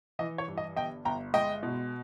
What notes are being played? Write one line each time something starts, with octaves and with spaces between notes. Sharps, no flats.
E3 D#5
C#5
G2
D#5
G1 D#5 G5
G1 G5 A#5
G#3 D#5 G5
B2